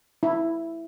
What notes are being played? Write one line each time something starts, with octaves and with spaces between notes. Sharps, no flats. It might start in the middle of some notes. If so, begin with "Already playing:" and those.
E4